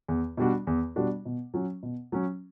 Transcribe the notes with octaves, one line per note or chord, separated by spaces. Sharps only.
E2
B2 G3 D4 F#4
E2
B2 G3 D4 F#4
B2
F#3 C#4
B2
F#3 C#4